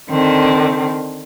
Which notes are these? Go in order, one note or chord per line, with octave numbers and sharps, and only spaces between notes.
D3 D#3 C4